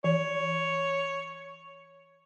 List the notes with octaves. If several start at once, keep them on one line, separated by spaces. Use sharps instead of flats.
E3 C#5